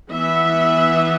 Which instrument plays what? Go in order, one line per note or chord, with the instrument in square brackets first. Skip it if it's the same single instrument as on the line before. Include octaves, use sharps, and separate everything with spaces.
[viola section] E3 B3 E5